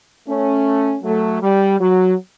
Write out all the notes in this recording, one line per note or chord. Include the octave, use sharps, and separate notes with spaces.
A3 C#4
F#3 A3
G3
F#3